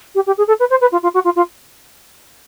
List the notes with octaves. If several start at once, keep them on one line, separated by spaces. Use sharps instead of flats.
G4
G4
G#4
A4
B4
C5
B4
F4
F4
F#4
F4
F4